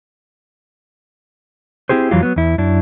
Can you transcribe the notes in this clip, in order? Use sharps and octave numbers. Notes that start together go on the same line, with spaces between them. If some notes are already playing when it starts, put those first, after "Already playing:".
C4 E4 G4 G#4 C5
F2 E3 F#3 G3 F4
F#3 B3
E2 E4
F#2 D4 E4